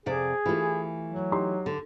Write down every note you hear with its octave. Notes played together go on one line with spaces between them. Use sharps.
F2 C3 G#4 D5
E3 A3 E4 F4 G4
F#3
D#4 G4 C6
D3